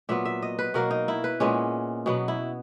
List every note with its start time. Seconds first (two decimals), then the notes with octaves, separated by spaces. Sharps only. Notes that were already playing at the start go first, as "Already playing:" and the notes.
0.09 A#2 F#3 B3 E5
0.25 E5
0.42 D#5
0.59 B4
0.74 B2 F#3 A#3 A#4
0.91 D#4
1.08 E4
1.24 B4
1.40 A#2 G#3 B3 C#4
2.06 B2 F#3 B3
2.28 E4